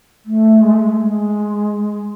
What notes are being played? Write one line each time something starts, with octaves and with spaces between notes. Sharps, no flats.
A3
G#3
A3
G#3
A3
G#3